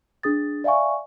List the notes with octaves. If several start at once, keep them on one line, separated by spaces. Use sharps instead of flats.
D4 G#4 D#6 A6
D5 E5 F5 G#5 C#6